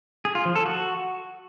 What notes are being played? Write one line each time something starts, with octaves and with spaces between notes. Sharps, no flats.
G#4
F4
F3
A4
F#4